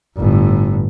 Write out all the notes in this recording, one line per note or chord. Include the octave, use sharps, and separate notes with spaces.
G1 A2